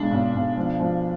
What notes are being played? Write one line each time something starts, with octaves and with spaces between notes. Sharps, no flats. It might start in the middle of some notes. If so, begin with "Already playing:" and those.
Already playing: B1 G#3 D4
B1
B1
F3
F3